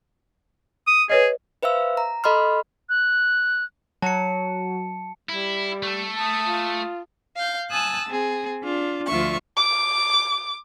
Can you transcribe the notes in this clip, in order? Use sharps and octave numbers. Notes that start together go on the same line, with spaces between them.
D#6
G#4 B4 C#5 D#5
B4 C5 E5 F5 E6
A#5
A4 D#5 B5 C6 F6
F#6
F#3 A5 C#7
G3 E4
A3 A4
A5 D#6
F4
F5 G6
G#5 A5 D#6 E6 F#6
C4 G#4
D4 F4
D2 F3 F4 E5 C#6
D6